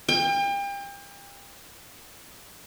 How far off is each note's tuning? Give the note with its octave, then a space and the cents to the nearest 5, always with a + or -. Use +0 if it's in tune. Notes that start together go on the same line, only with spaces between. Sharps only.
G5 +35